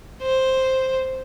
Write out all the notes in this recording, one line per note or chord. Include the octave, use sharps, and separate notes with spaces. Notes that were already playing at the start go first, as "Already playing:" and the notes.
C5